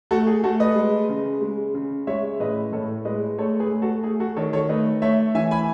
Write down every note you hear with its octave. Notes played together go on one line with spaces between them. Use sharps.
A3 F#4 A4
G#4
A3 F#4 A4
B4 D#5
G#3
C#3
G#3
C#3
G#3 C#5 E5
A2 B4 D#5
A2 A4 C#5
G#3 B4 D#5
A3 A4 C#5
G#4 B4
A3
F#4 A4
A3 G#4
F#4 A4
D#3 A4 C#5
A4 C#5
A3 B4 D#5
A3 C#5 E5
E3 E5 G#5
G#5 B5